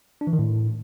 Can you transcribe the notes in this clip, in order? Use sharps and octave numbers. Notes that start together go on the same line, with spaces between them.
D4
E3
D#3
A2